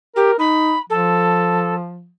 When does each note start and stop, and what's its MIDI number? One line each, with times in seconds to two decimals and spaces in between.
0.16 0.31 67
0.16 0.36 70
0.39 0.74 63
0.39 0.79 83
0.90 2.10 53
0.90 1.75 69